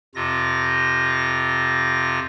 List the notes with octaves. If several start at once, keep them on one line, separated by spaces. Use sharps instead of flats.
F2 C3 F4 A#6